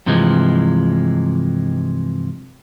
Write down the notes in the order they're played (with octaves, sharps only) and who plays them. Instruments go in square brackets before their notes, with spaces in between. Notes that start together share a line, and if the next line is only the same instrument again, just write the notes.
[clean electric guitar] G2 C3 E3 F3 G#3